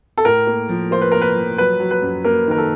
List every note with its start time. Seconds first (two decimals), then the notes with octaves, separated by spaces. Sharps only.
0.18 A4
0.25 A2 A#4
0.47 A#3
0.69 F3
0.91 A#3 C5
1.01 B4
1.12 A#3 A#4
1.22 B4
1.36 F3
1.58 F#3 B4
1.80 F#3
1.91 B4
2.02 F#2
2.24 A#3 A#4
2.47 D#3 A#4
2.58 A4